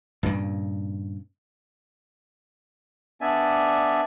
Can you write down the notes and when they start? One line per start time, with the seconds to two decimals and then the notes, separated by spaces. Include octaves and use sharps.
0.23 G2 A#2 C#3
3.21 B3 D4 D5 E5 G#5